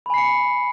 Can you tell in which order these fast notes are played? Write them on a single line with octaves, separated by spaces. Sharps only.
B5 G#5 C7 C#7